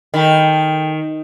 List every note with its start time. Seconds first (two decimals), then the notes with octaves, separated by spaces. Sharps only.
0.14 D#3 A4 G5 B5